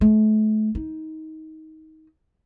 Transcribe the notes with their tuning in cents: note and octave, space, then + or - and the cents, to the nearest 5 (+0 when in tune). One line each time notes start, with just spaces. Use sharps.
A3 -35
D#4 +20